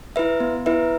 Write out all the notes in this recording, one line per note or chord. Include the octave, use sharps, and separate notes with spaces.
E4 B4 E5
B3
E4 B4 E5